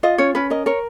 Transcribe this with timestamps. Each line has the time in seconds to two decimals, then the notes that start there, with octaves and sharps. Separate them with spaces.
0.03 F4 D#5
0.18 C#4 C#5
0.35 C#4 B4
0.50 A#4 D#5
0.66 A#4 C#5